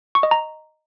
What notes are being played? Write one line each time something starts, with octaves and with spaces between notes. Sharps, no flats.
C#6
D#5
A#5